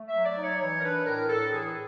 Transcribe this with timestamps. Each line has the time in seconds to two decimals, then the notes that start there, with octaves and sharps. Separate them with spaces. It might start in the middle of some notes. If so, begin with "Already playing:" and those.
Already playing: A3
0.08 E5
0.15 F#3
0.25 D5
0.37 D#4
0.44 C#5
0.61 E3 C#5
0.79 A#4
0.84 D4 B4
1.06 A2 A#4
1.29 A2 A4
1.53 E3 G#4